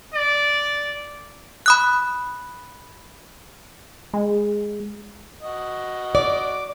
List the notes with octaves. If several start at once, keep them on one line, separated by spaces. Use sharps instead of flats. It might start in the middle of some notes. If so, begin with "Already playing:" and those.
D5
B5 D#6 F#6
G#3
F#4 D#5
D5 D6